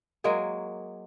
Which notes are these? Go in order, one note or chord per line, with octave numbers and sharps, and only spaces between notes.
F#3 G#3 A#3 G#4